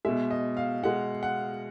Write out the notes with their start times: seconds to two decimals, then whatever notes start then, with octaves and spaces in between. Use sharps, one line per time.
0.05 B2 G#3 E5
0.31 D#5
0.57 F5
0.83 B2 G#3 F#5
1.23 F#5